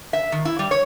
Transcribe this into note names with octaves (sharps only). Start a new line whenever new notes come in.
E5
D#3
E4
G3
C#5